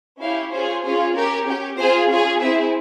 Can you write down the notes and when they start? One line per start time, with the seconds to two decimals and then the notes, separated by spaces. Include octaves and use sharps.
0.20 C#4 E4 G4 F5
0.51 C#4 F4 G#4 C5
0.83 C#4 F4 G#4
1.14 C#4 G4 A#4
1.46 C#4 G4
1.77 C4 F4 G#4 C5
2.08 C#4 F4 G#4
2.40 C4 E4 G#4 E5